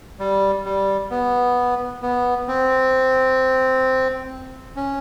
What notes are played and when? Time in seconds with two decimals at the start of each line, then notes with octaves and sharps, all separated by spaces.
0.19 G3
0.65 G3
1.11 B3
2.02 B3
2.48 C4
4.76 C#4